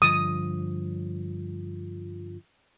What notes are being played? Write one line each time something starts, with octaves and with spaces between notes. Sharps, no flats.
G2 D3 F3 D#6